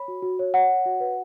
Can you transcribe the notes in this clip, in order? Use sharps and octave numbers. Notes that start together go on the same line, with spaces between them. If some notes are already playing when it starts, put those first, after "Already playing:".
Already playing: C#5 B5
F#4
F#4
C#5
C#5 F#5
C#5
F#4
B4